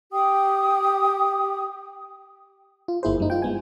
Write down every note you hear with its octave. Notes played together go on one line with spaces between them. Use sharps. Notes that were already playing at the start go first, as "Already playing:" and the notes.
G4 G5 D#6
F4
G1 A#3 E4 G#4 C5
F#2 G3 D#4
F4 G5
G#3 B3 G#5